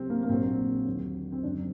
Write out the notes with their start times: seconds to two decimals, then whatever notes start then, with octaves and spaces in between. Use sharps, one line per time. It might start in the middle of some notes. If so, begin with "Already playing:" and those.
Already playing: C2 C3 F#3 C4
0.10 A#3
0.23 A#3
0.29 A#1 A#2 F#3 C4
0.86 D#2 D3 F#3
1.32 C4
1.43 F#1 F#2 D3 F#3 D4